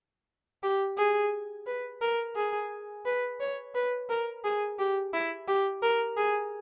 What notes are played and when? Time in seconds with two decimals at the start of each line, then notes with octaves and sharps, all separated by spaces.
0.63 G4
0.97 G#4
1.66 B4
2.01 A#4
2.36 G#4
3.05 B4
3.40 C#5
3.75 B4
4.09 A#4
4.44 G#4
4.79 G4
5.13 E4
5.48 G4
5.82 A#4
6.17 G#4